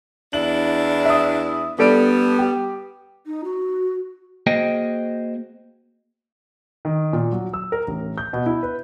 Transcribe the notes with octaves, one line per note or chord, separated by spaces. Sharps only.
E2 D4 E4 F#7
E5 D#6
G3 B3 D4 A4 D7
G4
D#4
F#4
A#3 F#4 G#4 C5 D#5 G5
D#3
A#2
F#3
E6
A#4
A1
G6
B2
E4
B4